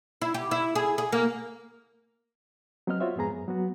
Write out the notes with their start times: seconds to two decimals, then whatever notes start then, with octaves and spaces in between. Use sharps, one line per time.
0.22 E4
0.34 G4
0.51 E4
0.75 G#4
0.98 G#4
1.12 A#3
2.87 F#3 B3 C4 D#5 F6
3.00 F4 F#4 C5 C#5 E5
3.16 F2 G#2 B3 G#4 A#5
3.30 F#2
3.48 F#3 B3 F#4